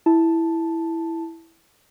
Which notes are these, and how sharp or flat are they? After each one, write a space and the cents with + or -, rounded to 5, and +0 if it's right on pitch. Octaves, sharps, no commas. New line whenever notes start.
E4 +0 A5 +0